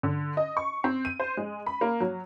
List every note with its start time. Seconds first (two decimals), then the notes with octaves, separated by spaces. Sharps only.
0.03 D3
0.37 D#5
0.57 C#6
0.84 C4
1.05 D#7
1.20 C5
1.37 G#3
1.66 B5
1.81 A#3
2.00 F#3